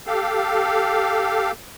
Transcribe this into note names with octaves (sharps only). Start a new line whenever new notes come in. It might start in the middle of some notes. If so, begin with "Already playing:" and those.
G4 A4 F5